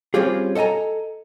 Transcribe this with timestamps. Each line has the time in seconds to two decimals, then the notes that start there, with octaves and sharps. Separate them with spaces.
0.14 G3 C4 C#4 F4 G4 G#4
0.55 A4 D#5 F#5 G#5 A#5